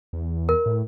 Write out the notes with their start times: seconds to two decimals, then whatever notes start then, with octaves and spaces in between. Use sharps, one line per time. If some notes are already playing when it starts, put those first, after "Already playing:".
0.13 E2
0.49 A#4
0.66 A2